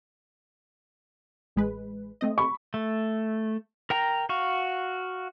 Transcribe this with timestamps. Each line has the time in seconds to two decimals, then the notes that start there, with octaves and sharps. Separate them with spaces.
1.56 A1 G#3 B4
2.21 A3 C4 D#5
2.38 B5 C#6
2.74 A3
3.90 A#4 G5 A#5
4.29 F#4 F5 C#6